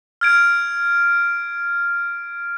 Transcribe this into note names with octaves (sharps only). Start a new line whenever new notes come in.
F6 G#6 D7